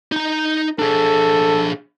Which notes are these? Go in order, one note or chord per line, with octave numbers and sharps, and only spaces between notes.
D#4 A#5
D4 G#4 A4